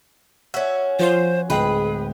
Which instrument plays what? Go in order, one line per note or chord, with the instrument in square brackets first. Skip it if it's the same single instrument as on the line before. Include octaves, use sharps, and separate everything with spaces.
[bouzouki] C#4 F#4 [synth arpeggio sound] E5
[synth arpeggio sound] F3 F4 C6 [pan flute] C5
[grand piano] D1 G#3 G5 [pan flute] G#4 [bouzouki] B4